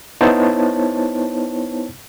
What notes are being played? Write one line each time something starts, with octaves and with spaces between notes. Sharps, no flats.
B3 D#4 E4 C5 C#5 A5